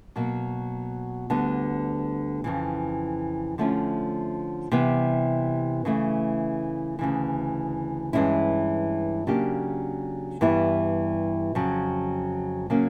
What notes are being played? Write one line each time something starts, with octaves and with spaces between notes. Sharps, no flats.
B2 F#3 A#3
D2 D3 G3 B3
F2 C#3 E3
D3 F3 A3 C#4
C3 E3 G3 B3
C#3 E3 A3
D2 C#3 E3
G2 E3 G#3 C#4 E4
C#3 F#3 A#3 D4 G4
G2 E3 G3 B3 E4
F2 C#3 F#3
C#3 F#3 A#3 C#4